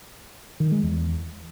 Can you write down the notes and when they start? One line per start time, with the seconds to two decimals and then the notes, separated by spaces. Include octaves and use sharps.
0.60 D#3
0.72 G#3
0.83 E2